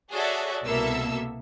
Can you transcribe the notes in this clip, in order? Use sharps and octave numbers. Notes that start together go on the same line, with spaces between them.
F#4 G#4 A4 C#5 D5 E5
C2 B2 A#3 A4 E5 E6